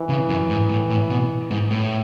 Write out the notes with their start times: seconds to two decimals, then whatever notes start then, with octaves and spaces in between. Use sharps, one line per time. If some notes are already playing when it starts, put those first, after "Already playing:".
Already playing: E3
0.09 C#3
0.29 F#2
0.50 G#2
0.69 A2
0.89 A2
1.09 B2
1.51 G#2
1.71 A2